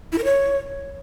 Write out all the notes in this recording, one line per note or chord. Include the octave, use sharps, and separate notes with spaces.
E4
A#4
C#5